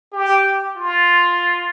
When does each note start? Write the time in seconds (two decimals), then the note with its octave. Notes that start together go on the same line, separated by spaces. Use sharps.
0.13 G4
0.76 F4